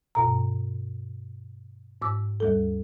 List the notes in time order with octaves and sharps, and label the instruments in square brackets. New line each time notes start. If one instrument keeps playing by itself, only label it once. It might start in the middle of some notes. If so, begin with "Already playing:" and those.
[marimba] G2 B2 A#5
G#2 D6 E6
D#2 G3 A4